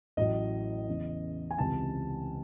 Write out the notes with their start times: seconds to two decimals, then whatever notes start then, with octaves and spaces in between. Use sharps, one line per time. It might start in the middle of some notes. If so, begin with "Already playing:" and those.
0.17 A1 A2 F#3 D#5
0.88 E2 C#3 E3
1.51 G#5
1.58 C#2 C3 E3 A5